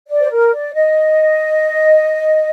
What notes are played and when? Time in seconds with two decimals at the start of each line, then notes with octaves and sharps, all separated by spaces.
0.09 D5
0.22 C5
0.31 A#4
0.52 D5
0.74 D#5